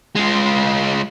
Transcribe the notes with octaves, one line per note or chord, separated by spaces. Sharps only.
G#3 F4